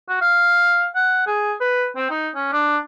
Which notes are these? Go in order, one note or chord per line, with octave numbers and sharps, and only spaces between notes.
F#4
F5
F#5
G#4
B4
C4
D#4
C#4
D4